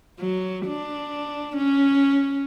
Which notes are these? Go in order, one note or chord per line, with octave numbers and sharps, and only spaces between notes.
F#3
D4
C#4